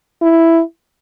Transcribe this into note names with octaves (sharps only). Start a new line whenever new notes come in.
E4